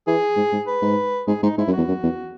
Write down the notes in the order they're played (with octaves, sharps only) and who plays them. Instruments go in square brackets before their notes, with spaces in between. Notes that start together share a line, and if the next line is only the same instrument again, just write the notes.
[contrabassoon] E3 [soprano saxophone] G#4
[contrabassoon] G#2
G#2
[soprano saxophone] B4
[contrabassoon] G#2
[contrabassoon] G#2 [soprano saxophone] G#4
[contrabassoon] G#2 [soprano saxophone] D#4
[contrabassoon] G#2 [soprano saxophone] E4
[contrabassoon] F#2
[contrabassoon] E2 [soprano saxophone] F#4
[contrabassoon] F#2
E2